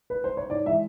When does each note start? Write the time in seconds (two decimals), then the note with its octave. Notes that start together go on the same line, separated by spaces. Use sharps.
0.10 B4
0.24 C5
0.37 C#5
0.50 G#2 D5
0.65 E3 G#3 E5